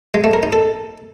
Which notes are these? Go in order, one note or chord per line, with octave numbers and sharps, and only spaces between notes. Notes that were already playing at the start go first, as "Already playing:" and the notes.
G#3
A3
A#4
D#4
A4